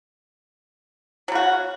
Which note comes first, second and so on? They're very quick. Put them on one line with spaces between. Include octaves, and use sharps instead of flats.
F#3 C#3 F#4